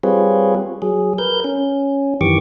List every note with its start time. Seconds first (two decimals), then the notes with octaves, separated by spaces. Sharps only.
0.03 G3 C4 F4 G#4 B4 C#5
0.82 F#3 G#4
1.18 A#4 B4 G6
1.44 C#4
2.21 F#2 D#3 E3 G4 C#6 D6